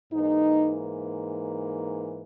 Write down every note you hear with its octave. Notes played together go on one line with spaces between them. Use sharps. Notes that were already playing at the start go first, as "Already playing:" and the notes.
G#2 E3 A#3 D#4